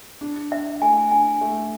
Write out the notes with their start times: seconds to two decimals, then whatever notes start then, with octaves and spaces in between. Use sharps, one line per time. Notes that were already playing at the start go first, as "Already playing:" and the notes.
0.21 D4
0.51 D4 E5
0.82 A3 G#5
1.12 D4 G#5
1.41 A3